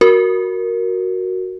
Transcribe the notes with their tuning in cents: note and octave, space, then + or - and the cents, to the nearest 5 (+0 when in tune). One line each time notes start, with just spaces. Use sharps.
F#4 +0 A#4 +0